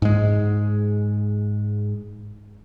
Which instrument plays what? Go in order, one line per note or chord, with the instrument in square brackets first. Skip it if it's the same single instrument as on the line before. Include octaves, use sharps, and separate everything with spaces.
[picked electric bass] G#2 G#3